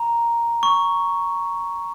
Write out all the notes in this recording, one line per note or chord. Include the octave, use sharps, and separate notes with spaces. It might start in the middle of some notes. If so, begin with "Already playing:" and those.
Already playing: A#5
C#6